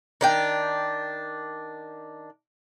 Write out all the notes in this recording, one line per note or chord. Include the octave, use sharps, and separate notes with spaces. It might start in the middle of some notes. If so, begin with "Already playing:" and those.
D#3 D4 G5